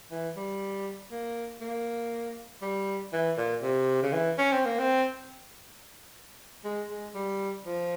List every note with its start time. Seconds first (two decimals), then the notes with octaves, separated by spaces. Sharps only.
0.11 E3
0.36 G3
1.11 A#3
1.61 A#3
2.62 G3
3.13 E3
3.37 A#2
3.63 C3
4.03 C#3
4.13 E3
4.38 C#4
4.52 C4
4.66 A#3
4.79 C4
6.65 G#3
6.90 G#3
7.15 G3
7.65 F3